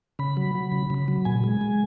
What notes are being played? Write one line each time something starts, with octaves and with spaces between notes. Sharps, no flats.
C#3 B5
F#3
F#3
C#3
C#3
F#3
A#2 G#5
G#3
G#3